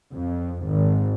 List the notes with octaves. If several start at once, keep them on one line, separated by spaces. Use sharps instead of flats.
F2
G#1